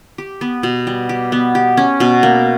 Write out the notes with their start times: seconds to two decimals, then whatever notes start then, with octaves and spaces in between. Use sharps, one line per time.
0.18 G4
0.41 B3
0.63 B2
0.87 G3
1.09 G4
1.32 B3
1.55 G4
1.77 C#4
2.00 B2
2.23 A#3